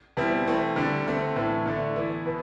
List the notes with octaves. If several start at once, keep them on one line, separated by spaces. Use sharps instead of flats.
B2 G3 C4 E4
E3 A3 C4
D3 G3 D4
D3 A3 C4
A2 E3 A3
D3 A3 D4
E3 B3 E4
B2 B3